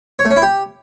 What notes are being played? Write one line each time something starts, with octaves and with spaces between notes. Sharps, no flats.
C#5
A3
C#4
E4
G4